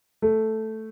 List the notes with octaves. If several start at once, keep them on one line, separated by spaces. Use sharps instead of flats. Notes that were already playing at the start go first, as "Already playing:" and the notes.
A3